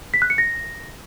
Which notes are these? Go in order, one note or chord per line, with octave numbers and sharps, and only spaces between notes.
B6
F#6
C#7
A#6